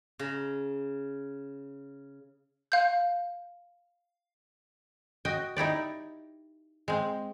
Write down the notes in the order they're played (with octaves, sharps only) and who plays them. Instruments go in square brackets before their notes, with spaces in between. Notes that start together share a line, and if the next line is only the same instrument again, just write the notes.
[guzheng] C#3 A#5
[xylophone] F5 G6
[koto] F#4 D#5 G5
D#4 E4 G4 D5
G#3 C4